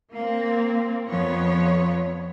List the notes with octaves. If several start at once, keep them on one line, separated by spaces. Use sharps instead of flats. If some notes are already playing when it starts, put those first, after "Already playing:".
A#3 C4
F2 F3 B3 C#5